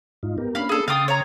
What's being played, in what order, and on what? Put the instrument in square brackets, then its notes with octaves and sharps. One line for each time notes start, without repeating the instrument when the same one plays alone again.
[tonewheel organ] G#2 D#4 F4
B3 G4 A#4
[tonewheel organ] A#3 C#4 D4 [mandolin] F5 B5
[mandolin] G#4 A4
[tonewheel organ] C#3 C6 A6 [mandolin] F5 G5 D#6
[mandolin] C#5 A#5